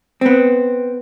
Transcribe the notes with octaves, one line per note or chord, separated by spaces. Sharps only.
B3 C4